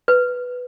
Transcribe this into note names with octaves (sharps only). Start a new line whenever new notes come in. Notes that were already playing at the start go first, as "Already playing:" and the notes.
B4